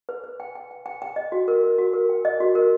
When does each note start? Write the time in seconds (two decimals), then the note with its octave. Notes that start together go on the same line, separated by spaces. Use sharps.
0.09 B4
0.24 B4
0.40 G5
0.55 G5
0.71 G5
0.86 G5
1.02 G5
1.16 D#5
1.32 F#4
1.48 A#4
1.64 A#4
1.78 F#4
1.93 A#4
2.09 G5
2.25 D#5
2.40 F#4
2.55 A#4